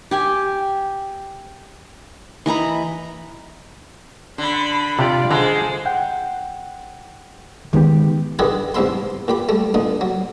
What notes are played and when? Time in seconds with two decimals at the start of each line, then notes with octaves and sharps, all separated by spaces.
0.11 G4 G5 G#5
2.46 E3 D#5 A#5 B5
4.38 D3 D4 B5
4.99 C3 F4 G4 D5
5.31 D3 G#3 C5 A#5
5.86 F#5 G5
7.73 D#3 G#3 B3 D#4 G4
8.39 D3 D#3 E4 G4 G#4 B4
8.74 E2 G#2 C3 E5 B5 C6
9.28 A#2 G4 B5
9.49 G3 A3
9.74 A#2 D3 D#4
10.01 F#3